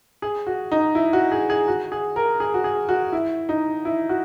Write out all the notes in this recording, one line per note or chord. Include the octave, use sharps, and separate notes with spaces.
G#4
F#4
D#4
E4
F#4
G#4
G#4
F#4
G#4
A#4
G#4
F#4
G#4
F#4
E4
D#4
E4
F#4